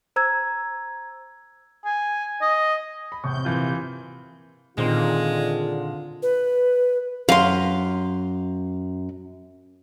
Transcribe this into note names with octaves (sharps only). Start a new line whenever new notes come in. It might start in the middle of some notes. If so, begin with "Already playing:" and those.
C5 A#5 E6 G#6
G#5
D#5
B5
E2 A2 C3 C#6 G6
A#2 E3 F4
A#2 D3 D#3 G#3 C4 F4 C6
B4
F#2 F5 C6